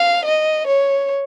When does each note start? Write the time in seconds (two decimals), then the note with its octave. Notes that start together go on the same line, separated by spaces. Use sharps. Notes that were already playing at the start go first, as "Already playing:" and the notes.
Already playing: F5
0.25 D#5
0.67 C#5